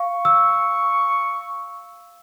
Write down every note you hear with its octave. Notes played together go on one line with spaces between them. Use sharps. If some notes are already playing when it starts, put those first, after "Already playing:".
Already playing: F5 C#6
E6